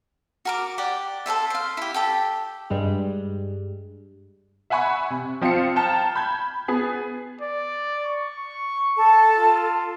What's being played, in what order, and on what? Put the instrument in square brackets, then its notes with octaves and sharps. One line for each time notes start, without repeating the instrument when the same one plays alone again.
[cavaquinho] F#4 A#4 D6
G4 D5 F#5
A4 A#4 C5 E5
C5 F5
E4 G4
G4 A4 G5
[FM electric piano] G2 G3 G#3
[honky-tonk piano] E5 F#5 G#5 B5 C#6
C3
F3 C4 F5 C7 C#7
G5 A5 A#5 F6
B5 G6 G#6
B3 G#4
[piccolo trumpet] D5
C#6
[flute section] A4 A5
[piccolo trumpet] F4